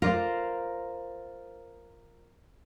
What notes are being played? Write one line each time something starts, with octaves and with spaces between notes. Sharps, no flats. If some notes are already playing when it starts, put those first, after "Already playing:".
F4 A#4 C5 D5